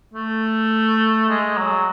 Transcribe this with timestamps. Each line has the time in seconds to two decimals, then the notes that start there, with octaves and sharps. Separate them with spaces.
0.14 A3
1.29 G#3
1.57 F#3